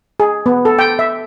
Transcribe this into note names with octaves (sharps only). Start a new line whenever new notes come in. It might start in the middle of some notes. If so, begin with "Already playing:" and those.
G#4
B3
A4
G5
E5